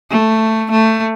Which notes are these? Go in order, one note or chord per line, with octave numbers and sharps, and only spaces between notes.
A3
A3